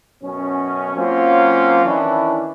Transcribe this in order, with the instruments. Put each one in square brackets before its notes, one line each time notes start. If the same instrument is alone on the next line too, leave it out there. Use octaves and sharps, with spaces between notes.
[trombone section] F#2 B2 C#4
F#3 A#3 C4 C#4 F4
D#3 E3 C#4 D4 E4